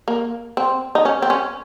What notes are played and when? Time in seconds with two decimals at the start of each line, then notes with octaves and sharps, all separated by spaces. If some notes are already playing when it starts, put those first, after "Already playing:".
0.08 A#3
0.57 C4
0.95 D#4
1.05 C#4
1.22 C4
1.30 C#4